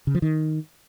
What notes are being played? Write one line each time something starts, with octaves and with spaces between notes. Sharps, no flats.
C#3
F3
D#3